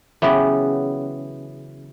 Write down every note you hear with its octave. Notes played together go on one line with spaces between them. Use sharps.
C#3 E3 F#3 B3 G4